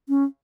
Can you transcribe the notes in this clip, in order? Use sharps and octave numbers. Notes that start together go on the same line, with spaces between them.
C#4